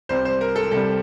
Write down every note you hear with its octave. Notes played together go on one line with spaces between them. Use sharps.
C2 C3 G3 C5
C5
A#4
A4
C2 C3 G3 A4